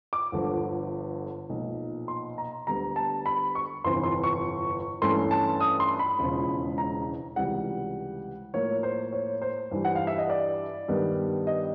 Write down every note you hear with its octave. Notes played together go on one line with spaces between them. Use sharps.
D6
G1 G2 D3 F3
B1 A#2 F3
C6
A#5
D2 D3 G3 B3 A#5
A5
B5
C#6
G1 F2 C3 E3 C6
C6
C#6
G2 E3 A3 C#4 E4 C6
A5
D#6
C6
B5
E1 E2 C#3 F3 G#3
A#5
C#2 C3 E3 G3 F#5
A2 F3 A#3 C#5
C5
C#5
C5
G2 E3 G3
F#5
F5
E5
D#5
D5
G2 D#3 G3 B3
D#5